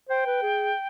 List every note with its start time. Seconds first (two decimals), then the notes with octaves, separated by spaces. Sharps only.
0.09 C5 G5
0.26 B4
0.42 G#4